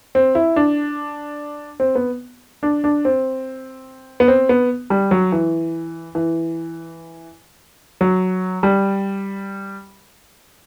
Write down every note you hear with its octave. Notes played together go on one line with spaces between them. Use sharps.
C4
E4
D4
C4
B3
D4
D4
C4
B3
C4
B3
G3
F#3
E3
E3
F#3
G3